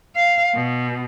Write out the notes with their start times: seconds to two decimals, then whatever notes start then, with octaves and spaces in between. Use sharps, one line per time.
0.16 F5
0.55 B2